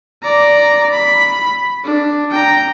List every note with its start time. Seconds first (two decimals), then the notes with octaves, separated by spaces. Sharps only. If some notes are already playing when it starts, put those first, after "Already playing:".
0.22 D5 A#5
0.92 B5
1.84 D4
2.31 G5 A#5